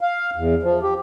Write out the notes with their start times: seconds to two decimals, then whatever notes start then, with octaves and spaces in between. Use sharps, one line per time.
0.01 F5
0.36 E2
0.63 F3
0.83 G4